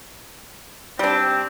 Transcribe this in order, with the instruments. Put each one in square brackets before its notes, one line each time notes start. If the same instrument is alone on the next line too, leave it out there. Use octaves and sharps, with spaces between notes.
[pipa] G3 D4 [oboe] C4